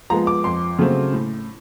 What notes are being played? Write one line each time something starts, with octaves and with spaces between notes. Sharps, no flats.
F3 G#3 B3 A#5
D6
F2 C6
C#3 F#3 A3 C4
A2